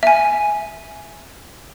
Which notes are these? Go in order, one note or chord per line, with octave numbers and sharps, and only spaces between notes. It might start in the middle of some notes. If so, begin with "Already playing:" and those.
E5 G#5